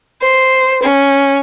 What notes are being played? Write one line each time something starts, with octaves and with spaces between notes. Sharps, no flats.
C5
C#4